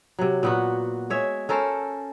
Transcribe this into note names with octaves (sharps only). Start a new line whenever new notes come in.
C3 F#3
A#2 B3 F#4
G#3 C#5 E5
C#4 A4 A#4 C5